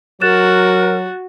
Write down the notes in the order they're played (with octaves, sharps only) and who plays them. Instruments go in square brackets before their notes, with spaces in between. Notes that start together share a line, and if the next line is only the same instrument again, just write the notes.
[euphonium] F#3 [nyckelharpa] F#4 [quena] A#4 [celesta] F#6 A6 E7